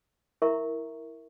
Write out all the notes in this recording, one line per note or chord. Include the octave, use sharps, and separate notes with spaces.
E4 A#4 E5 A#5 C#6